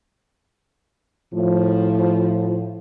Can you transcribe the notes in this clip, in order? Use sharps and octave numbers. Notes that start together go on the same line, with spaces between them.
A2 F3